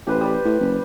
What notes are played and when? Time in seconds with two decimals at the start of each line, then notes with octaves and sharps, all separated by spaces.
0.07 A1 G4 B4 C5
0.21 G3
0.45 A2
0.60 F#1